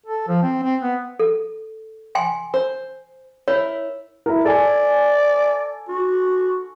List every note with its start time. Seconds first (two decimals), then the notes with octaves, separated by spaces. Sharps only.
0.06 A4
0.28 F3
0.43 C4
0.63 C4
0.83 B3
1.20 A4
2.15 G5 G#5 C6
2.54 C5
3.48 E4 A#4 C#5
4.26 E4 A#4
4.45 A4 D5 G#5
5.89 F#4